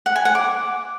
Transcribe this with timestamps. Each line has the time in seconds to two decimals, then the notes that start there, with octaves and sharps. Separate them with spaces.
0.06 F#5
0.16 G#5
0.25 F#5
0.35 D6